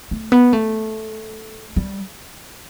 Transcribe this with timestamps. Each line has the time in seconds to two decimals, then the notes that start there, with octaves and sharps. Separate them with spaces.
0.11 A3
0.32 B3
0.53 A3
1.76 G3